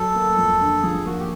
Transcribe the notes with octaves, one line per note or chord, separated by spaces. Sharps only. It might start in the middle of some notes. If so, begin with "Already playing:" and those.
Already playing: F#3 A4
A#3
F2
D3
F3 G#4
A#3 F#4
G4